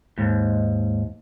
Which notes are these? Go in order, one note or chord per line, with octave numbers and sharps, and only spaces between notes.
D#2 G#2